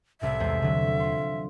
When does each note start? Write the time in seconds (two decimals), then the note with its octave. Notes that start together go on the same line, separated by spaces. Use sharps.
0.21 C2 A2 E5
0.40 E2 G#3 C5
0.60 E2 D3 F#3
1.00 F4 C6